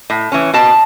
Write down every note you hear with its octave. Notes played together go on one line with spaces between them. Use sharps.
A2
E3 C#4
B2 A5